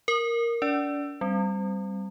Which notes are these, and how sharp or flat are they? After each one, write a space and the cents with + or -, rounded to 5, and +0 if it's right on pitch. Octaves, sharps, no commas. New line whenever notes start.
A#4 +0 D#6 -35
D4 -45 D5 +0
G3 +0 C4 +0